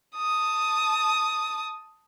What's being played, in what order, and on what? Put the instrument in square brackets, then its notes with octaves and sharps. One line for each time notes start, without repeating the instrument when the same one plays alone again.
[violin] A5 D#6